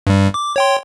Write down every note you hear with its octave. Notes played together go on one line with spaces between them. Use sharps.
G2 G3
D6
C#5 G5 C6